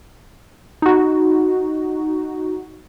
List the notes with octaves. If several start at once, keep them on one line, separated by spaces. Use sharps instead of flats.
D#4 F#4